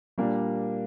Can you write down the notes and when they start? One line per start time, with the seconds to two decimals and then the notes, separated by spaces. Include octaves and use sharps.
0.18 A#2 G3 A#3 D4